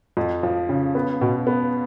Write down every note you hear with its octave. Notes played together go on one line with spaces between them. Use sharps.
F2
F3
C#3
B3
B2
B3